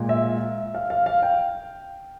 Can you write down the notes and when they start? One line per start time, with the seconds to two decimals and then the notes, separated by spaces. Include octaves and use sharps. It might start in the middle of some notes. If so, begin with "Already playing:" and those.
Already playing: A#2 G#3
0.09 E5
0.75 F5
0.90 F5
1.06 F5
1.22 G5